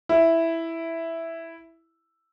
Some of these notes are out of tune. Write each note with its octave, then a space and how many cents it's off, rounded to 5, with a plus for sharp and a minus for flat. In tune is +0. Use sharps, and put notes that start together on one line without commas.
E4 +0